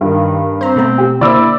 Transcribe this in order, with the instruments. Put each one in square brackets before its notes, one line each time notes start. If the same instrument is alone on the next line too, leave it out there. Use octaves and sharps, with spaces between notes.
[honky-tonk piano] G2 [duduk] D#3
[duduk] C4 [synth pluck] C5 A#5
[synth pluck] B2 A3 A#5
[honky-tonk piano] G4
[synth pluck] D3 A#3 C5 [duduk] E4 [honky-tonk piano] D5 E6